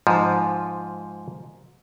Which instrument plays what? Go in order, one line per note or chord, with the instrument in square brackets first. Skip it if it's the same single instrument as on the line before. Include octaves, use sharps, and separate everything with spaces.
[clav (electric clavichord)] G#2 F3